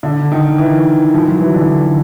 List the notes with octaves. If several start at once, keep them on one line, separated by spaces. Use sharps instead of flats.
D3
D#3
E3
F3
F#3
E3
D3